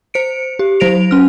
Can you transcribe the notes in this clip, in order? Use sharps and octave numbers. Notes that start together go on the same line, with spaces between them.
C5 C#7 D7
G4
F#3 C5 A#6 D7 F7
C#4 F6